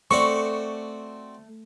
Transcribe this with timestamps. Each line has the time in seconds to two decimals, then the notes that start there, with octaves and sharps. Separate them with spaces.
0.11 A3 C4 F#4 D5 C#6